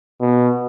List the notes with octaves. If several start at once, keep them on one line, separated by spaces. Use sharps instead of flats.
B2